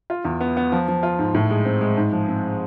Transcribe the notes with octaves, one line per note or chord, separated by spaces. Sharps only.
F4
E2
B3
B3
F3
F3
F4
G#2
A2
G#3
C4
G#3
G#2
F3
C4